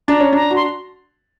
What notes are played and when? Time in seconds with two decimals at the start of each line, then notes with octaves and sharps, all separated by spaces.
0.08 D4 A#5
0.20 C#4
0.33 D4 A#5
0.51 F#4
0.56 C6